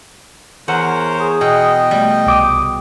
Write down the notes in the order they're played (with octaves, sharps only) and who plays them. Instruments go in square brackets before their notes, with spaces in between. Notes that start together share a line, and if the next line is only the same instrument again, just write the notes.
[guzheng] E2 F#5 [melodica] A#4 C5 C#5
[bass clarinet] G#4
[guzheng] B2 [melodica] D#5 G5
[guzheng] G3 [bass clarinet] A3
[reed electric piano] C2 D6 D#6